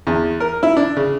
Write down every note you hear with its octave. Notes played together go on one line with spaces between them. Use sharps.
E2
A#4
E4
D4
C#3